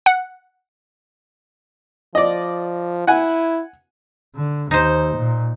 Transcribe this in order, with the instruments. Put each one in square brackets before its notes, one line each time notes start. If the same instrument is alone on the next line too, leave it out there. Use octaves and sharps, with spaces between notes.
[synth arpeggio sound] F#5
[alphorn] F3 [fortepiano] D5 D#5
[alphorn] E4 [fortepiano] F#5 G#5
[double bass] D3
[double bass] D#2 [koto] D#4 C5
[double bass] A#2